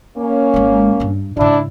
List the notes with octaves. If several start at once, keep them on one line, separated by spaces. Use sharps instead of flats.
A#3 C#4
G#1 G#3
G2 D4
G#2 C#3 D4 E4